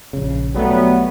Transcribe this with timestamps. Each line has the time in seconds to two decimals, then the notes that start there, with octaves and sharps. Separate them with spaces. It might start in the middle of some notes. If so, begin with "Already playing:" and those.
0.13 A#1 C#3
0.55 B1 F#3 G3 A3 B3